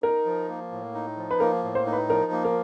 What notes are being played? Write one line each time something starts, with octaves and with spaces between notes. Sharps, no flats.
D#4 A#4
F3
A#3
A2
D#4
F3
B4
A#3 A#4
A2
C5
D#4
B4
F3 A#4
A#3
A#4